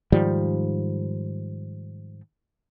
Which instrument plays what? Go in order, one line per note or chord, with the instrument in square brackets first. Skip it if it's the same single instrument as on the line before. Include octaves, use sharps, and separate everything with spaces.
[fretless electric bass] G#2 D#3 F3 G3